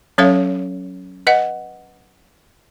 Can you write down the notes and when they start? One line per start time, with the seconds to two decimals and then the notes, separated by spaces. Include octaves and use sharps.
0.18 F#3 C#4 A4 C#5 E5 F5
1.27 B4 D#5 F#5